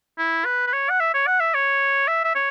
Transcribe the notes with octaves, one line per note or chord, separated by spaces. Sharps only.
E4
B4
B4
C#5
F#5
E5
C#5
F#5
E5
C#5
E5
E5
C#5